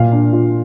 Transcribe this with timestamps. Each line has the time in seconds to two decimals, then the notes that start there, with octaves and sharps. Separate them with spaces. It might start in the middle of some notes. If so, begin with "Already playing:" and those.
Already playing: A#2 F5
0.12 D4
0.33 F4